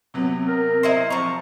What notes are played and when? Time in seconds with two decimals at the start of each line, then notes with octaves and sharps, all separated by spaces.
0.14 C3 F#3 B3
0.48 A#4
0.83 D#4 E4 C5
1.10 F3 A#5 C#6